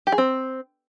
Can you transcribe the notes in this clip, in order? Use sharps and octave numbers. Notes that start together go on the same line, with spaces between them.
G4
G#4
C4